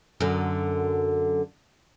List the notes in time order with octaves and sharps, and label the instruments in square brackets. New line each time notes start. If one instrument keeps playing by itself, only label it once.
[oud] F#2 D3